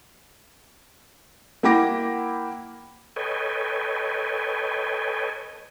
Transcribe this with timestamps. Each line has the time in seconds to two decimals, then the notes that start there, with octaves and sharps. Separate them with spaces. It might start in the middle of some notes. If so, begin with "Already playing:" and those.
1.63 A#3 E4 F#5 G5 D6 A#6
3.16 A4 B4 C#5 D#5 G5 G#5